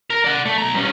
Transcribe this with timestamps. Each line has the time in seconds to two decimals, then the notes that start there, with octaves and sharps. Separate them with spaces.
0.10 A#4 A#5
0.24 D5 F#5
0.46 A3
0.58 B1 A#5
0.74 G2 C#4